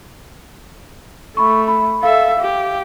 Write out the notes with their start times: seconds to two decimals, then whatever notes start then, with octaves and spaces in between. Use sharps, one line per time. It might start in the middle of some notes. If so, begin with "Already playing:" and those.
1.37 A3 B5 C#6
1.68 B5
2.03 A4 E5 F5
2.39 G4